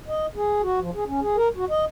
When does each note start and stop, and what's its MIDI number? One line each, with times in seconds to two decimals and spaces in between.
0.08 0.26 75
0.36 0.62 68
0.62 0.80 66
0.80 0.90 53
0.95 1.04 68
1.07 1.20 61
1.21 1.36 68
1.37 1.48 70
1.56 1.65 66
1.70 1.85 75